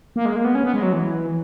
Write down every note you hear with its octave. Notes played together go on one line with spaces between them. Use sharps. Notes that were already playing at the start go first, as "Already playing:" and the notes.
A#3
G#3
A#3
B3
C#4
B3
G#3
F#3
E3